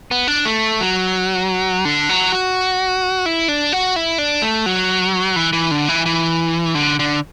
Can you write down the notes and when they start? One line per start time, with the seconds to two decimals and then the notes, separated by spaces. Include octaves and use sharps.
0.11 B3
0.28 D4
0.45 A3
0.80 F#3
1.85 D3
2.09 F#3
2.32 F#4
3.26 E4
3.48 D4
3.72 F#4
3.96 E4
4.18 D4
4.42 A3
4.66 F#3
5.36 E3
5.53 E3
5.71 D3
5.89 E3
6.06 E3
6.75 D3
6.99 D3